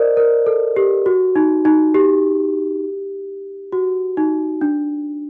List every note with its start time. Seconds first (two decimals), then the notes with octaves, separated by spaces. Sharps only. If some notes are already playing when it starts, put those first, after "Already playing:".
Already playing: A#4 C5 D5 D#5
0.17 A#4
0.46 A4
0.76 G4
1.06 F#4
1.36 D#4
1.65 D#4
1.95 G4
3.72 F#4
4.17 D#4
4.61 D4